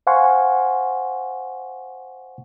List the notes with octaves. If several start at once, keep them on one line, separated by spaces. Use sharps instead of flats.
C5 F5 F#5 G#5 C6 C#6